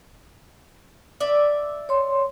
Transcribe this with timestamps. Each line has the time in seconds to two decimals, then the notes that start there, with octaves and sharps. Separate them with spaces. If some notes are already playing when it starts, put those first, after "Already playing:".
1.20 D5 E5
1.89 C#5 C6